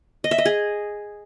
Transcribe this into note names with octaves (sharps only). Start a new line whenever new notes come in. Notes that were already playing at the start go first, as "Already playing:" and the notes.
D#5
E5
D#5
G#4